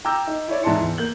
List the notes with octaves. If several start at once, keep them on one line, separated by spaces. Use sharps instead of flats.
G5 A#5 D6 E6 G6
D#4
E4 C#5 D5
G#2 E3 E5 A5 C6 C#7
E2
A#3 G6 F#7